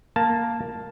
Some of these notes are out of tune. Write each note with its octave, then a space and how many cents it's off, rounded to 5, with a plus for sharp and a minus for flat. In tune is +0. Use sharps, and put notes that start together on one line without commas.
A#3 +0 A5 +0